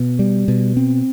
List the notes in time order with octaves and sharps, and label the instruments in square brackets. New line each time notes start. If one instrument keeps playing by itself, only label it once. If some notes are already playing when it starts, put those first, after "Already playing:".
Already playing: [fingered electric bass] B2
G3
B2
C4